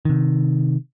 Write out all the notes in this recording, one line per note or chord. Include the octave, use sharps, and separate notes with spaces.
C3 D#3